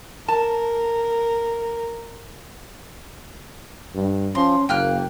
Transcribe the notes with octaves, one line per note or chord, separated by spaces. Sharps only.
A#4 A5
G2
F3 C#4 C6
F#1 A#3 G5 F6 F#6